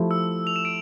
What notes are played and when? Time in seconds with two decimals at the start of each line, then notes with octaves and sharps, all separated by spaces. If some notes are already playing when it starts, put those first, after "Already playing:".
Already playing: F3 A3 E4 G4
0.11 E6
0.47 F7
0.56 E7
0.65 D7